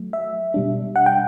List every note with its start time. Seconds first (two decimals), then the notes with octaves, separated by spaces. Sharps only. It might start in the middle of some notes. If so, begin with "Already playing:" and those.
Already playing: F#3 A3
0.13 E5
0.54 B2 G3 D4
0.96 F#5
1.06 G5